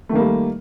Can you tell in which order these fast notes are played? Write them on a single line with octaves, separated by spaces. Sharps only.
A3 D#3 A#3 G3